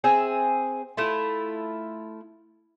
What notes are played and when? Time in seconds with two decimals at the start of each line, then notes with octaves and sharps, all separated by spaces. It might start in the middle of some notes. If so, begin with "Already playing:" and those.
0.04 C4 G#4 E5
0.97 A3 E4 F4